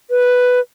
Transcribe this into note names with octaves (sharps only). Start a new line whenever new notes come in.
B4